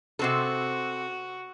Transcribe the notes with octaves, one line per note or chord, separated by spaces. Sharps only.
C3 C4 F#4 A4